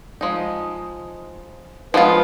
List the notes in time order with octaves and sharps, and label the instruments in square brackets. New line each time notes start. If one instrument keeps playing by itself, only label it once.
[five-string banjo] F3 G#3 D#4
[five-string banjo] F3 G#3 B3 F4 [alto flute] B4